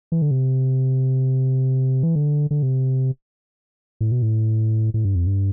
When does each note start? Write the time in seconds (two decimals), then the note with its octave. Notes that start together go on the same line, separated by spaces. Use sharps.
0.12 E3
0.22 D3
0.31 C3
2.03 E3
2.16 D3
2.51 D3
2.63 C3
4.01 A2
4.12 B2
4.22 A2
4.94 A2
5.05 G2
5.15 F2
5.27 G2